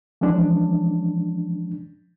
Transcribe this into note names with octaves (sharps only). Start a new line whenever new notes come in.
E3 F3 G#3 C#4 D4